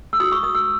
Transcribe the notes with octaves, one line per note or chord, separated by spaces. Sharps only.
E6
F#4 D#6
C#6
A#4 D#6
E6